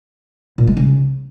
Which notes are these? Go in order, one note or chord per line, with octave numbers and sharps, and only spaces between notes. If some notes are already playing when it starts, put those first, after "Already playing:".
A#2
G#3
C#3